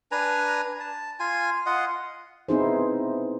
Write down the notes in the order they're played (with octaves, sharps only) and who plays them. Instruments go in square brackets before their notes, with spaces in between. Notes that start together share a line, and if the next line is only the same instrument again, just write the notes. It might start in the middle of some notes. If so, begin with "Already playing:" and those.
[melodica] D4 B4 G#5 A#5
A5
F4 G#5
F4 D#5 F#5
[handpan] B3 C4 D#4 E4 G#4 C5